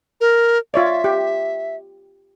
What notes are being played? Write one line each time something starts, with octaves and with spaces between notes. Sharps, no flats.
A#4
F4 C#5 D5 E5
G4